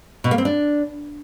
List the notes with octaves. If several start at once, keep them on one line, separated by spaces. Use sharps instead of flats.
B2
A#3
C4
D4